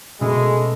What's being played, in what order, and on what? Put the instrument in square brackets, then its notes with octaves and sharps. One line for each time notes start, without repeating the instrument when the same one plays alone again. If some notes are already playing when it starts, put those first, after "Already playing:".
[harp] B2 A3 C#4 G#4 [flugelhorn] G#3